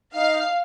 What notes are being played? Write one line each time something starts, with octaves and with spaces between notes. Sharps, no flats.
D#4 F5